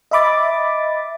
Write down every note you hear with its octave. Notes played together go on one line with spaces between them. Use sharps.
D#5 E5 B5 D6 A6